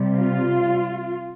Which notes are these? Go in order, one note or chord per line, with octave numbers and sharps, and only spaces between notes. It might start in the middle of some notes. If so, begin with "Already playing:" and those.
Already playing: C3 G3
F4